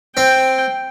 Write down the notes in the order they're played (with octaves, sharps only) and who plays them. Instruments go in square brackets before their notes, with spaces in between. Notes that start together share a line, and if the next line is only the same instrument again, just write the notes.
[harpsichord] C4 [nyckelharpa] G5